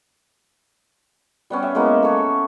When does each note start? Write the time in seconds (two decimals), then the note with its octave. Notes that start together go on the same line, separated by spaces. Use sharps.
1.50 G3 B3 C#4
1.63 E5
1.75 G#3 A#3 B3 E4
2.03 A4 C#5